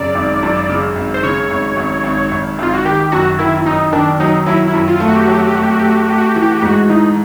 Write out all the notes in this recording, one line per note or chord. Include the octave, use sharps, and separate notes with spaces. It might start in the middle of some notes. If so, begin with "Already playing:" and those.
Already playing: F#2 C#3 D5
G#1
F#2
C#3
G#1
C5
C#3 C#5
G#1
G#1
G#1
G#1
G#1 F4
F#4
D#3 G4
F#2 F#4
D#3 E4
F#2 D#4
D#3 D4
F#3 D#4
F#3 E4
E4
F#2
F4
A3
F#4
G4
F#4
F#3 G4
F#4
G4
A3 F#4
G4
F#4
A3 G4
F#4
G4
F#4
A3 G4
F#4
G4
E3 F#4
G4
F#4
G4
G#2 F#4
E3 D#4